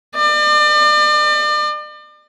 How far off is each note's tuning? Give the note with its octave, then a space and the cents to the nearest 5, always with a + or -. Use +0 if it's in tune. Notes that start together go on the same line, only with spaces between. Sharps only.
D5 +40